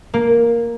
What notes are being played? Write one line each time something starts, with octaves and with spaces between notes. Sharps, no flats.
A#3